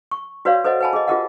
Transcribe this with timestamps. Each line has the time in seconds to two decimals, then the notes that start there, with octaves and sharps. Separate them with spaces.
0.11 C#6
0.45 F#4 B4 C#5 D5 F5
0.64 A4 B4 C5 D#5 E5 F#5
0.80 B4 F#5 G#5 A5 B5
0.93 G#4 D#5
1.08 F4 G4 G#4 A#4 D#5 F#5